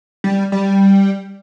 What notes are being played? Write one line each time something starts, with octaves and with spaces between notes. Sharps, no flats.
G3
G3